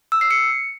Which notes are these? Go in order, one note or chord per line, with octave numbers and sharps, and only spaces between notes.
E6
C7
C#7